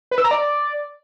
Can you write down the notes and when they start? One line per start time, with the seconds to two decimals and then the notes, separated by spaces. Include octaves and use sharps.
0.11 B4
0.18 E6
0.24 A#5
0.31 D5